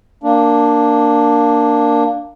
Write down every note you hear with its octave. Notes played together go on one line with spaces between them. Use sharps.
A#3 D4